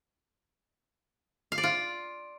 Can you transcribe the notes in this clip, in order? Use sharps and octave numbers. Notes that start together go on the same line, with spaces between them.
F5
D5
F4